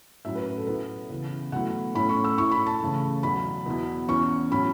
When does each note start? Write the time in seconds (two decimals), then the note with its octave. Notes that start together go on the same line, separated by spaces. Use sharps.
0.25 A2 F#3 C#4 E4 E5
0.35 B4
0.46 B4
0.57 A4
0.67 B2 B3 E4 B4
1.10 C#3 E3 B3
1.52 B2 F#3 A3 E4 F#5
1.95 A2 A3 C#4 E4 B5
2.09 C#6
2.24 E6
2.38 A2 A3 E4 C#6
2.52 B5
2.67 A5
2.80 C#3 E3 A3
3.23 E2 B2 F#3 B5
3.66 E2 B2 B3 E4
4.08 E2 E3 C#4 C#6
4.51 A2 F#3 C#4 E4 B5